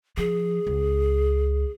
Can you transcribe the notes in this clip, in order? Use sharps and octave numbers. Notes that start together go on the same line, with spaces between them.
F3 G#4
C#2